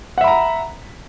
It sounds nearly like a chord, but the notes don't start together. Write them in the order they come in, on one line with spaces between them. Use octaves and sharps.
F#5 E5 B5 A#5